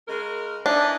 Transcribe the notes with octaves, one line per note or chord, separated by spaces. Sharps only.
C#3 G#3 A#4
E3 D4 D#4